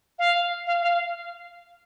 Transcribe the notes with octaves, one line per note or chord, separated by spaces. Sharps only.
F5
F5
F5